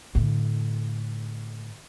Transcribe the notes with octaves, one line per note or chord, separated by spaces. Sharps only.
A2 D3